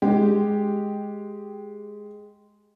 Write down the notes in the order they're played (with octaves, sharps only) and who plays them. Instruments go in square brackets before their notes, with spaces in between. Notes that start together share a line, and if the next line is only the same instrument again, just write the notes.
[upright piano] G#3 G4